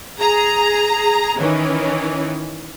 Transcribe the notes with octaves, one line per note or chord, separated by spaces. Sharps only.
G#4 A#5
D#3 E3 C#4